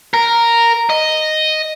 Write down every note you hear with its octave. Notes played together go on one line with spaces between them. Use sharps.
A#4
D#5